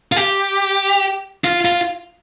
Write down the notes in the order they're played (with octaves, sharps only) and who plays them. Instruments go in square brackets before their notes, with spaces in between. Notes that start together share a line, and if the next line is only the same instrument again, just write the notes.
[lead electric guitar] F4
G4
F4
F4